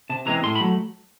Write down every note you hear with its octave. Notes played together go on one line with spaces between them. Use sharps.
C3 A5
E3 G#3 C4 A#5
A2 C6
B5
F#3 A3